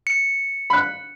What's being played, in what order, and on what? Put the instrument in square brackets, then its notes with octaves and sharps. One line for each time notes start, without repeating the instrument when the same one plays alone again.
[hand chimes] C#7
[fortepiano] B5 F#6